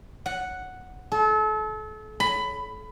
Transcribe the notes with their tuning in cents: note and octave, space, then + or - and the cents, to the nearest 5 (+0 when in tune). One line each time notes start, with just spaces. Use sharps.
F#5 +0
A4 -35
B5 +15